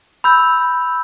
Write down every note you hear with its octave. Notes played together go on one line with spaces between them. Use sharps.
B5 E6 G6